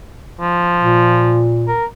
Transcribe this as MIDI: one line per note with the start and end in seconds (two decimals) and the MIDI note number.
0.41 1.48 53
0.79 1.75 46
1.68 1.85 70